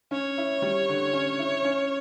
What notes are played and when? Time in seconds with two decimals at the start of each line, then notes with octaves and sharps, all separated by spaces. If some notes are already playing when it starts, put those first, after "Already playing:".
0.11 C#4 C#5
0.38 E4
0.62 G3
0.89 D3
1.13 C#4
1.39 E4
1.65 C#4